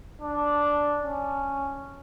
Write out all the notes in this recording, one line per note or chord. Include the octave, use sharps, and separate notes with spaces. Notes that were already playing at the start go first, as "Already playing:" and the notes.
D4
C#4